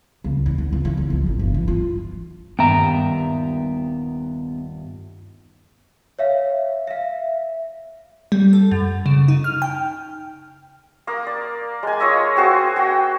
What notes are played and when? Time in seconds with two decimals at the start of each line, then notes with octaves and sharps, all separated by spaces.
0.24 C#2
0.46 E2
0.58 D2
0.73 C#2
0.85 E3
0.98 C#2
1.10 F3
1.26 A1
1.39 G1
1.54 E3
1.68 F4
2.59 D#1 G2 B3 E5 G5 A#5
6.19 C#5 E5 F5
6.87 E5 F5
8.32 G3
8.53 A4
8.71 F#2
9.06 C#3
9.28 D#4
9.44 F6
9.62 G5
11.07 A#3 D#6
11.27 D5
11.83 G#3 G#5
12.00 F4 C#5 D#5 E5
12.36 C4 F#4 G#4
12.76 F#4 G5